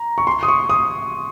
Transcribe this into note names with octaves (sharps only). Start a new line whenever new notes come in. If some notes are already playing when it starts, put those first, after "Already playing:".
Already playing: A#5
C#6
C6
D#6
C#6
D#6